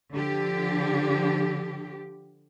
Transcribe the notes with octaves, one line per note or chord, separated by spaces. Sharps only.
D3 F3 G4